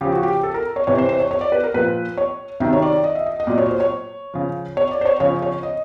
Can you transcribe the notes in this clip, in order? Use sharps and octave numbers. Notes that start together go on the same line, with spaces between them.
C#3 F3 G4
F#4
G4
A4
A#4
C#5
C3 E3 C#5
C5
C5
C#5
C#5
D5
B4
A#4
A#2 F3 B4
C#5
C3 D#3 F#3 E5
C#5
D5
D#5
E5
D#5
D#5
A#2 F#3 D5
C#5
C5
C#5
C#3 F3
C#5
D5
C5
C#5
C#3 F3 C#5
C#5
D#5